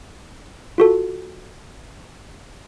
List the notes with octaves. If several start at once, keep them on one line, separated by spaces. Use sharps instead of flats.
F4 F#4 A4